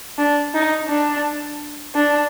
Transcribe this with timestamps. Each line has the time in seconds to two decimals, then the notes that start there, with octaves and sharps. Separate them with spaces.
0.18 D4
0.54 D#4
0.89 D4
1.95 D4